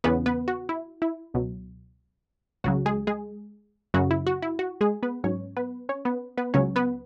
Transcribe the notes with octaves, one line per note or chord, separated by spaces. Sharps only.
E2 C#3 E3 B3 B4
B3 B4
F#4
E4
E4
C#2 B2 F#3
C#2 C#3 F#3 F#4
G#3 G#4
G#3 G#4
F#2 C#3 F#3 F#4
E4
F#4
E4
F#4
G#3 G#4
B3 B4
G#2 F#3 C#4 C#5
B3 B4
C#4 C#5
B3 B4
B3 B4
C#2 C#3 F#3 C#4 C#5
B3 B4